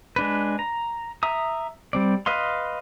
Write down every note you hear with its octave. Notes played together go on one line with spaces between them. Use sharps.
G#3 D4 B4
A#5
E5 A#5 D#6
G3 C4 D5
B4 D#5 F5 C6